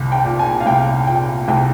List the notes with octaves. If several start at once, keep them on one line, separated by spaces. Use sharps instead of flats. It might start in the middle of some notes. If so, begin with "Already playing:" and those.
Already playing: C2 A#2
G5
A#2
G#5
F5
C2 G5
A#2 G5
C2 G5